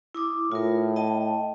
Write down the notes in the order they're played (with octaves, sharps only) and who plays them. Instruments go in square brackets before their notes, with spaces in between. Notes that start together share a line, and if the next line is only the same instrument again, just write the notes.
[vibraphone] E4 D6 D#6
[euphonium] A2 [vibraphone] F4 A#4
[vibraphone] D#5 G5 A5